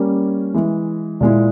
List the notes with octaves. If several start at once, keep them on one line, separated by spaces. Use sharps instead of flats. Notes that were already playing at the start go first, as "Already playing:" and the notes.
Already playing: G3 A#3 C#4
E3 G#3 E4
A#2 G#3 E4